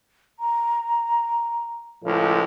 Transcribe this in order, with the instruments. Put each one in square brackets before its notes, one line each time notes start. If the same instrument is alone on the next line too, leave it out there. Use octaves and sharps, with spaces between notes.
[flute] A#5
[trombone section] C#2 A2 F3